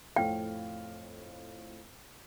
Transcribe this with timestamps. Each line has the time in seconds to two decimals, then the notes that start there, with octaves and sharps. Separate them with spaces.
0.16 F2 A2 F5 G5